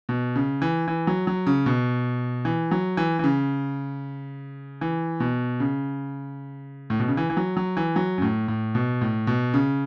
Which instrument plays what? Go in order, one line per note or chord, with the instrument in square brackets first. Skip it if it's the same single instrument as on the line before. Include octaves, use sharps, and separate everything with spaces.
[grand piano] B2
C#3
E3
E3
F#3
F#3
C#3
B2
E3
F#3
E3
E3
C#3
E3
B2
C#3
A2
B2
C#3
E3
E3
F#3
F#3
E3
F#3
F#2
A2
A2
B2
A2
B2
C#3